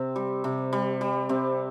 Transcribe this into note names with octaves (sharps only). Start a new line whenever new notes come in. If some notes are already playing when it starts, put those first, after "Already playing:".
Already playing: C3 C4
G3
C3
G3
G3
C3 C4